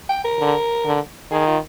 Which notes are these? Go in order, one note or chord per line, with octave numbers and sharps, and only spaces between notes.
G5
A#4
D3
D3
D#3 G#4
F4